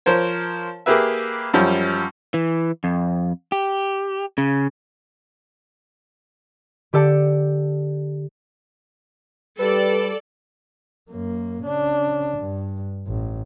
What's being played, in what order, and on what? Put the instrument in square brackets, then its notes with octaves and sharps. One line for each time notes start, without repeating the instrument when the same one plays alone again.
[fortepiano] F3 A#4 C5 C#5
A#3 G4 G#4 B4 E5
F#2 F3 G3 C#4
[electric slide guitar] E3
F2
G4
C#3
[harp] D3 G4 A4 D5 A5 C#7
[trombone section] G3 [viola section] A4 D5 [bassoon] B4
[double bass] F#2 A#3
C#3 D4
G2
A1